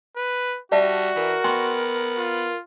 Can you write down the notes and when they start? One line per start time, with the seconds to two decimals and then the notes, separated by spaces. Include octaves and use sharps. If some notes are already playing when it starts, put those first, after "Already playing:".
0.17 B4
0.72 G3 F#4 D5 E5 A5
1.16 E3 A#4
1.44 B3 G5 C6 C#6
2.18 F4